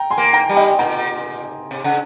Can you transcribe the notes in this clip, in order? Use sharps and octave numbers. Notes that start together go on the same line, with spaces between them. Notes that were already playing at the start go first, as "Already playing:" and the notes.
Already playing: G5 A#5
G#5 C6
A#3
G5 A#5
G3
D#5 G5
A#2 G5 A#5
C3
C#3